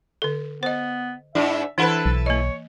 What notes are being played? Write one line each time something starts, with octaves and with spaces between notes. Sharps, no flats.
D3 A4
B3 C5 D#5
G#2 D4 E4 E5
E3 D4 E4 A4 B4 F#5 B5
B1
A#3 C#5 D#5